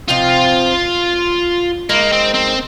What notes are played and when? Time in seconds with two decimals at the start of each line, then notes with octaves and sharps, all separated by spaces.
0.08 C3 F3 C4 D#4 F4
1.89 G#3 A#3 D#4 A#4
2.12 C4
2.34 C4